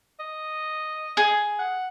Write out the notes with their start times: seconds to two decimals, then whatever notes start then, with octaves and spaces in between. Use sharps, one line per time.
0.20 D#5
1.17 G#4
1.59 F#5